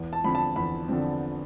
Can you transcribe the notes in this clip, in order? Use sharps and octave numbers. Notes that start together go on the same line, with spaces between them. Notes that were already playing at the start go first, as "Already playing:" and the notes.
Already playing: E2
A5
D3 F3 C4 B5
A5
E2 B5
D3 F3 C4